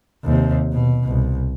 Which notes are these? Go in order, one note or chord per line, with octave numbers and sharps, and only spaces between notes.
D#2 C3
B2
C2